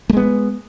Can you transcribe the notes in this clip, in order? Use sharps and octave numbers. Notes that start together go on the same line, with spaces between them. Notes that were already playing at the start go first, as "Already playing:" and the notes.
G#3 A3 B3